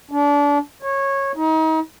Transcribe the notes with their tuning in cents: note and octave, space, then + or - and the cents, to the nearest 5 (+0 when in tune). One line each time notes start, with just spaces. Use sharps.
D4 -30
C#5 -15
D#4 +35